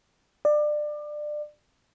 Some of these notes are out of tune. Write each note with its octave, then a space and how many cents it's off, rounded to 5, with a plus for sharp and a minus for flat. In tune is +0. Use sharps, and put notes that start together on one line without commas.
D5 +25